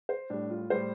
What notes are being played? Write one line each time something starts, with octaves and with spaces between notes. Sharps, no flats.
C5
A2 G3 D4
F4
A2 G3 C5